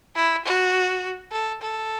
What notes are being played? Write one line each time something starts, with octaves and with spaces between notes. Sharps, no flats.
E4
F#4
A4
A4